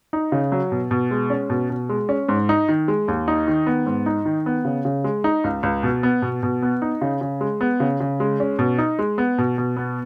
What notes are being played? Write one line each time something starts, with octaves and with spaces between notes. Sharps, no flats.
D#4
C#3
F#3
B2
B2
G#3
C#4
B2
B2
G#3
C#4
G#2
D#4
D#3
G#3
D#2
D#4
D#3
B3
G#2
D#4
D#3
B3
C#3
C#3
G#3
D#4
C#2
C#2
B2
B3
B2
B2
B3
D#4
C#3
C#3
G#3
B3
C#3
C#3
G#3
C#4
B2
D#4
G#3
B3
B2
B2
B3